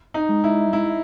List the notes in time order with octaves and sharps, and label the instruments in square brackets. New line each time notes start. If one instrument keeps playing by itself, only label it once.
[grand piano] D#4
[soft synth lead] G#3
[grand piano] E4
[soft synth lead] G3
[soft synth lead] G#3 [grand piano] E4